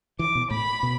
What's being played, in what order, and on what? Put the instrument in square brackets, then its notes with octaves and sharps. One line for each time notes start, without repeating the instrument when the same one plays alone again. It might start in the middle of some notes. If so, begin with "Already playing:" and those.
[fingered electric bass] E3 [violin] D6
[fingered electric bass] B2
[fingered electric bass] A2 [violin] B5
[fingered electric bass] B2